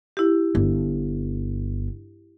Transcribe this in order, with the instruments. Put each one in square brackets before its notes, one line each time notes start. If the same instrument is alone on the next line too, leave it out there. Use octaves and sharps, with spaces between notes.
[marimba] E4 G4
[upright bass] G1